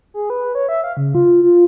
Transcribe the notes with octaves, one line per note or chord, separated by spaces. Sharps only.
G#4
B4
C#5
E5
F5
C#3
F4
F4